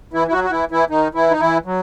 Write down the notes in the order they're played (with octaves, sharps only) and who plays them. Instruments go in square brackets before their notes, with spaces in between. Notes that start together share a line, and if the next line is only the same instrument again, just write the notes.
[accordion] E3 E4
E4
F#3 F#4
F#4
E3 E4
E3 E4
D#3 D#4
E3 E4
D#4
E3 E4
F#3